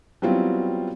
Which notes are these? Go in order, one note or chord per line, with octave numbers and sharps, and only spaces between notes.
F#3 G3 B3 C4 E4 F4